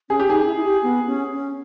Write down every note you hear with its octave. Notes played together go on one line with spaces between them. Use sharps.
C#4 G#4
G4
D#4 G#4
E4
E4
G4
B3
C#4
C#4